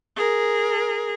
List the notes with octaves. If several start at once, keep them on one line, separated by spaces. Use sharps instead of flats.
G#4 A#4